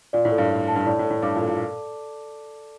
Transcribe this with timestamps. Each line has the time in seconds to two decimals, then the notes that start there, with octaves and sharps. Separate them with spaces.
0.13 A#2 D5
0.25 A2
0.32 A4
0.38 G2
0.50 D5
0.68 A5
0.76 G2
0.86 A2 D5
0.99 A2
1.04 A4
1.10 A2
1.22 G2 D6
1.36 A#2
1.41 A4
1.48 A#2